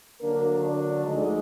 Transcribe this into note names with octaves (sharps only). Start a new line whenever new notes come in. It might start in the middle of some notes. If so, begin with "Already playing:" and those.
D3 F#3 A#3 D4 A#4
D4 D5
D2 D3 F3 G#3 D#4 D#5